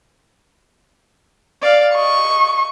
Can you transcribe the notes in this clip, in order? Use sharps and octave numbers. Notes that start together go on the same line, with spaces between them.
D5 F5
D#5 C#6